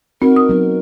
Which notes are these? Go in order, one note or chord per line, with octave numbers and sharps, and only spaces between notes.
C4 D#4 F#4 A#4
D#6
F#3 B3 D#4